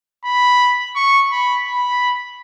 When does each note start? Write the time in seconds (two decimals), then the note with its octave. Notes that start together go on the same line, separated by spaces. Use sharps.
0.25 B5
0.96 C#6
1.31 B5
1.66 B5